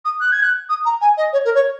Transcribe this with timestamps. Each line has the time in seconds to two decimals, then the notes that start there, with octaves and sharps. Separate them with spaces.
0.05 D#6
0.20 F#6
0.32 G#6
0.42 F#6
0.69 D#6
0.85 A#5
1.01 G#5
1.17 D#5
1.32 C#5
1.44 A#4
1.54 C#5